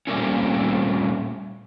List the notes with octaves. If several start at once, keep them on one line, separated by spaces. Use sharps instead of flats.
A#2 G3 A3 A#3 C4 C#4